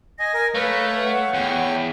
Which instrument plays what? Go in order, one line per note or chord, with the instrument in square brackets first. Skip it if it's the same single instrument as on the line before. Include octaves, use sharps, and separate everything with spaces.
[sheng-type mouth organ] D#5 G#5 [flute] A#6
[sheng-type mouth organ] A#4 G#5
[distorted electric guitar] A3 [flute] B4 [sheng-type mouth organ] C#5 F5
[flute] F#5
[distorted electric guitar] E2 [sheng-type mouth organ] C#5 G5 C#6